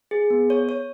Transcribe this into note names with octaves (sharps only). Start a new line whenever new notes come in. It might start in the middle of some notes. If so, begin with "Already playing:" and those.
G#4
B3
C#5
C#5